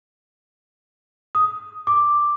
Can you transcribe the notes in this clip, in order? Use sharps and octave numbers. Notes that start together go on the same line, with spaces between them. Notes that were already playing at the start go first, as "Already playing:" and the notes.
D#6
D6